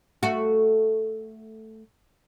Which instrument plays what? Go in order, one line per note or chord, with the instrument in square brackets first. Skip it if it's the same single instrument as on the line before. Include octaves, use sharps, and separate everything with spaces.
[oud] A3 F#4